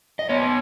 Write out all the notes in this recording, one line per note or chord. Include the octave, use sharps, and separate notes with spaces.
D#5
B3 C#5